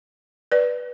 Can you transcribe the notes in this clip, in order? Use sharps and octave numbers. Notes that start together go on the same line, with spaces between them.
B4 D5